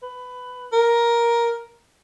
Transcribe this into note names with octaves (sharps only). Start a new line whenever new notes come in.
B4
A#4